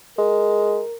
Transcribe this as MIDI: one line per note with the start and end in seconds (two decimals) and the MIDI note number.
0.18 0.81 56
0.18 0.98 70